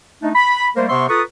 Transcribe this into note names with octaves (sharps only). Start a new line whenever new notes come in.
A3 D4 D#4
B5
G3 A3 A#3 A#4 C5
C3 B3 C5 E5 C6 C#6
F4 A4 B4 A#5 C#6 D#6